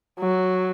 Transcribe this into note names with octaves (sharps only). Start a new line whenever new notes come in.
F#3